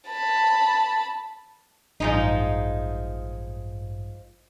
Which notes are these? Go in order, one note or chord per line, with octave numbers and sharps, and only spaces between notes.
A5 B5
A1 G2 F3 G#3 D#4